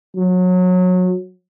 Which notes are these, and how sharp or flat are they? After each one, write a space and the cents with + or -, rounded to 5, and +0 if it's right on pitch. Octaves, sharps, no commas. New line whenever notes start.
F#3 -25